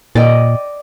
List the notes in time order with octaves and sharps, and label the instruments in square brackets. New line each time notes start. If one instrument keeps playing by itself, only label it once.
[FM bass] A#2 [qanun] D5 D#5 G5